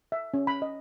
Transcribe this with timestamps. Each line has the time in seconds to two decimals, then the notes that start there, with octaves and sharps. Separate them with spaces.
0.12 E5
0.34 C#4
0.47 B5
0.62 D#5